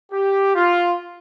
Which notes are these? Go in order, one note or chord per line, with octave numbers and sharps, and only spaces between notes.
G4
F4